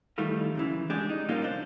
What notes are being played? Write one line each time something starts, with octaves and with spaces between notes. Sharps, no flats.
F2 D#3 E3 G3 A3 F4
F#2 C#3 E3
G#3 D4 G4 G#4
D#4
A#2 F3 G3 A#3 C#4 F4
C2 D4 C5